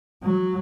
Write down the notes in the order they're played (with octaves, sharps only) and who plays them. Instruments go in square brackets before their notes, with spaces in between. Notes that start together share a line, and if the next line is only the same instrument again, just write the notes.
[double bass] F#3